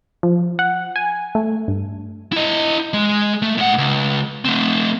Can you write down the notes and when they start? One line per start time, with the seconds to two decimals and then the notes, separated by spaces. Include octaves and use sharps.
0.23 F3
0.59 F#5
0.96 G#5
1.35 A3
1.68 G2
2.33 E4 D#5
2.93 G#3
3.42 A3
3.58 A2 F#5
3.78 C#2
4.45 A3 C4